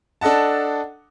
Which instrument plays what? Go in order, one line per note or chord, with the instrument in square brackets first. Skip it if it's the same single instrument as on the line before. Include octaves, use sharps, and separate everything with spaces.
[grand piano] D4 A4 D#5 F#5 A5